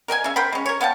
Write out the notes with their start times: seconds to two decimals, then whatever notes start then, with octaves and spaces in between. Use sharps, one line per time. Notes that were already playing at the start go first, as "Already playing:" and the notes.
0.08 A#4 D#5 G5 G#5
0.24 C#3 E5
0.36 A#4 C5 G5 B5
0.52 G#3 C#4
0.66 A#4 C#5
0.81 B3 F5 G5 A5